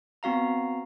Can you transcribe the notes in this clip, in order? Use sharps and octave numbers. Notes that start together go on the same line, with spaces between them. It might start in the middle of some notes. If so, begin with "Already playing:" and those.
B3 C4 F#4 F5 A#5